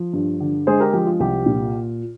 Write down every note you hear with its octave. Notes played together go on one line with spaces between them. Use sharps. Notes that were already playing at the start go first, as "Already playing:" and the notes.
Already playing: F3
G2
D3
G#3 G#4 C5
G4 A#4
F3 G4
F4
C2 G4
A#2